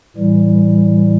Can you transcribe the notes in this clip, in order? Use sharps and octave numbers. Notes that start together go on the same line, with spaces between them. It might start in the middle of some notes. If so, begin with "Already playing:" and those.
A2 E3 G3